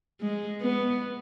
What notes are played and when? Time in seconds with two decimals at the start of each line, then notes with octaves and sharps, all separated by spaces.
0.21 G#3
0.62 B3